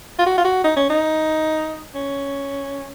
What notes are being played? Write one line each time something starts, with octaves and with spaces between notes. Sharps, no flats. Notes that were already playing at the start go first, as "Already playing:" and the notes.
F4
F#4
F4
F#4
D#4
C#4
D#4
C#4